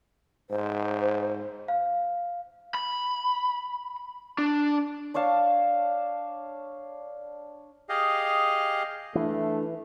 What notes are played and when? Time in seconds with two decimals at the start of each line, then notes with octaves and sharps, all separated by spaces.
0.50 G#2 C5
1.68 F5
2.75 B5
4.38 D4
5.14 D4 C#5 F5 A5
7.89 G4 G#4 D#5 F5
9.15 E3 A3 D4